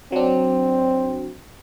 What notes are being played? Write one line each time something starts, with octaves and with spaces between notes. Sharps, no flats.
F#3 C4 D4